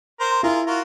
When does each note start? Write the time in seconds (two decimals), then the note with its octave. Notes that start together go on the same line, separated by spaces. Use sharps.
0.20 A#4 C5
0.43 E4 F4 G#4 A#4
0.67 F4 F#4 A#4